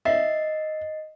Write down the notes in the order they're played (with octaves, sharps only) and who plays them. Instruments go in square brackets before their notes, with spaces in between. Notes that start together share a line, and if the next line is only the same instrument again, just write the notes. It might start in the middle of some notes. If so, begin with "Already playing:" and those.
[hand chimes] D#5 A6 C7 [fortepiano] E5